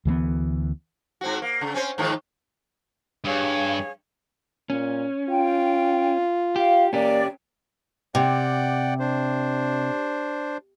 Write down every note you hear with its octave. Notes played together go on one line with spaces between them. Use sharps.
D2 E3 F#3 B3
G#2 C4 F#4
A#3
C#3
C4 C#4 C5
G#2 D#3 F3
G2 G#4 C#5 F5
A#2 C#4
F4 G5
G4 F5
A#3 C#4 G4 D5
C3 D5 F#5 G5
D4 C5